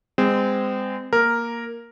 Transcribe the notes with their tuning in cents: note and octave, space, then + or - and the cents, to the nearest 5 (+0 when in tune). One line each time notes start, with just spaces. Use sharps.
G#3 -30 C4 -25
A#3 +5 A#4 +0